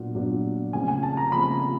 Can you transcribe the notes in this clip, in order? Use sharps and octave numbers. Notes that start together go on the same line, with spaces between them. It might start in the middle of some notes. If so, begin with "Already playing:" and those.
Already playing: A#2 F#3 B3 D4
A#2 F#3 B3 D4 F4
C#3 F3 A3 C4 G#5
G#5
A5
A#5
C#3 F3 A3 C4 B5